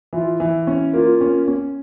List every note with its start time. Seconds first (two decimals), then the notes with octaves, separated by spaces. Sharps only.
0.13 E3 F4
0.40 E3
0.67 C#4
0.93 A#3 F4
1.21 C#4
1.48 C#4